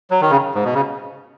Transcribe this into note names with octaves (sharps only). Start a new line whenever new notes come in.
F#3
D#3
C#3
G#2
B2
C#3